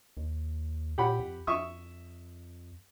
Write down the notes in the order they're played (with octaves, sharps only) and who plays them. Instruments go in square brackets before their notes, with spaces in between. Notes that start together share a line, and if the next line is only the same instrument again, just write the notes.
[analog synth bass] D#2
[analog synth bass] A#2 [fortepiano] G4 F#5 B5
[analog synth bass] F2
[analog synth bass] F2 [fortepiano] E5 C#6 D#6